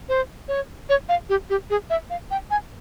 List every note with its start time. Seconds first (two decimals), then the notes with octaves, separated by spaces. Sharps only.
0.09 C5
0.48 C#5
0.89 C#5
1.09 F5
1.29 G4
1.50 G4
1.70 G#4
1.90 E5
2.10 F5
2.31 G5
2.51 G#5